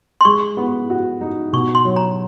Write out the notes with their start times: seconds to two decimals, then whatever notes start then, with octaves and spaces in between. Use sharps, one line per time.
0.21 C6
0.25 G#3 C#6
0.57 B3
0.90 F#4
1.21 D#4
1.53 B2 C#6
1.75 C6
1.85 F#3
1.96 A#5